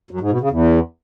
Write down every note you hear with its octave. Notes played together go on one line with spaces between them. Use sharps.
F#2
G#2
B2
C#3
E2